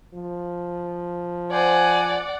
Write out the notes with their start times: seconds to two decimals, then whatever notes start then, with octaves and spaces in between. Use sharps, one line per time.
0.14 F3
1.52 C5 D5 F#5 G#5